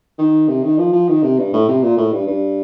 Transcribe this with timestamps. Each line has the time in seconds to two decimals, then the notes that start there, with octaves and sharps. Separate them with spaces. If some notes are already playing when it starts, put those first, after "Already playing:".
0.19 D#3
0.48 C3
0.64 D#3
0.78 F3
0.93 F3
1.08 D#3
1.23 C3
1.39 G2
1.53 A2
1.68 C3
1.83 A#2
1.98 A2
2.12 G2
2.28 G2